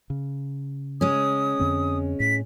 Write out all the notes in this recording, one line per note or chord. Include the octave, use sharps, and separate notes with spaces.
C#3
G#3 C#4 D#6
F2 D3 C4
A2 B6